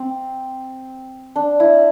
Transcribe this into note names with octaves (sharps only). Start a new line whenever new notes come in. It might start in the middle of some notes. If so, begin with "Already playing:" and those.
Already playing: C4
D4
E4